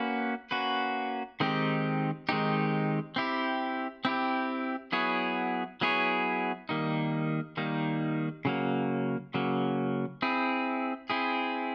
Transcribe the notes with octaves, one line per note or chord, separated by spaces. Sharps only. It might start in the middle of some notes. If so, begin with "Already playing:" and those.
Already playing: A#3 C#4 F#4 B4
A#3 C#4 F#4 B4
D#3 G#3 C4 D#4 G4
D#3 G#3 C4 D#4 G4
C4 E4 G4
C4 E4 G4
F#3 B3 E4 G#4 C#5
F#3 B3 E4 G#4 C#5
D#3 G3 A#3 D#4
D#3 G3 A#3 D#4
C#3 F#3 A#3
C#3 F#3 A#3
C4 E4 G#4
C4 E4 G#4